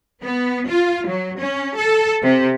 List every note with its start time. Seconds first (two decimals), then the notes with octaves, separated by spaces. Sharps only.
0.22 B3
0.69 F4
1.08 F#3
1.39 C#4
1.77 A4
2.22 C3